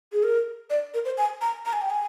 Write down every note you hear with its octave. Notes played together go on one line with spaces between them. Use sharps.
G#4
A#4
D5
A#4
C5
G#5
A#5
A#5
G#5
G5
G#5